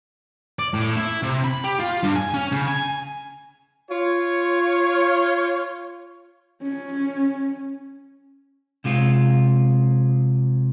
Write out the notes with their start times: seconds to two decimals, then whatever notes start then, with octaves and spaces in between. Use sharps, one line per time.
0.59 D5
0.73 A2
0.97 E4
1.23 C3
1.44 B5
1.64 G4
1.80 F4
2.03 G2
2.16 G#5
2.34 C#4
2.52 C#3
2.68 G#5
3.91 F4 C#5
6.62 C#4
8.84 C2 C3 G#3 F4